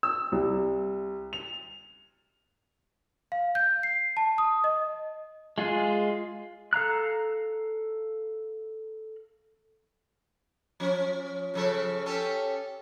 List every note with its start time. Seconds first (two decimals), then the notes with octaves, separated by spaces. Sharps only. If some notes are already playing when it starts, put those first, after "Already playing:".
0.03 E6
0.32 C2
1.33 F7
3.32 F5
3.55 G6
3.83 C7
4.17 A5
4.38 D#6
4.64 D#5
5.58 G#3 F4 G#4 F#6
6.73 A4 F5 A#5 F#6
10.80 F3 C#4
11.54 C#3 F3 A4
12.06 C#4 G4 A4